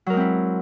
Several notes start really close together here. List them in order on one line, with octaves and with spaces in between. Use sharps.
F#3 A#4 G#3 C4 E4